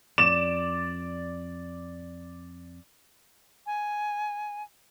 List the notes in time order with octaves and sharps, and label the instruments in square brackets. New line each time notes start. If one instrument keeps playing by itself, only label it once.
[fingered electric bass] F2 [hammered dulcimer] D5 [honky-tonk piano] E7
[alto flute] G#5